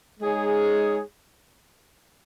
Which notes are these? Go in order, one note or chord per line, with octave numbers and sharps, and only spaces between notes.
G#3 D#4 G#4 C#5